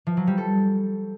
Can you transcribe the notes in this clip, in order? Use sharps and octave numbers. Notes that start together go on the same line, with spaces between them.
F3
F#3
G3
A4